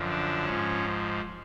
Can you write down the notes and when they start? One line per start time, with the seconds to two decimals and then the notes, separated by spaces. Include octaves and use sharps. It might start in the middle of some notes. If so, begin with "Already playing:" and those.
Already playing: F#2 D3 F3
0.09 D4
0.45 G#2 F3 C#4